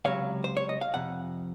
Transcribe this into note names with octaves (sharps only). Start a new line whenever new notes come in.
C#2 C3 F#3 C#5 F5
C5
C#5
D#5
F5
F2 C3 F#5